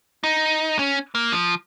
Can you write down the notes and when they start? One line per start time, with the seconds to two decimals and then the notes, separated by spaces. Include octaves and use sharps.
0.24 D#4
0.79 C#4
1.15 A#3
1.32 F3